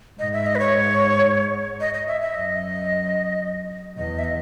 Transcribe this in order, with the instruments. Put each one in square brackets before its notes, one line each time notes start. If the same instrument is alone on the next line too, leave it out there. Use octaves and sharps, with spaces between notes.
[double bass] G#2 [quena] D#5
[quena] E5
D#5
B4
C#5
D#5
D#5
E5
E5
[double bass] F#2 [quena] D#5
[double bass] E2 [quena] D#5
[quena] E5
D#5